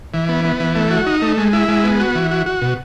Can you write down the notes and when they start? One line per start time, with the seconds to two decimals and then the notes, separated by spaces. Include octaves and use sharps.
0.14 E3
0.29 B3
0.45 B3
0.60 E3
0.75 A3
0.91 F#4
1.06 D#4
1.22 A3
1.38 G#3
1.53 E4
1.68 G#3
1.84 B3
2.00 F#4
2.15 E3
2.31 F#4
2.46 F#4
2.62 B2